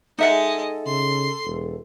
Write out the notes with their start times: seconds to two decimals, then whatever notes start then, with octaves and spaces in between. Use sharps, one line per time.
0.18 G#3 D#4 A4 D#5 E5 F#5
0.86 C#3 C6
1.44 E1